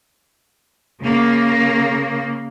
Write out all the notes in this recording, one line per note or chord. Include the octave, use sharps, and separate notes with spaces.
C#3 A#3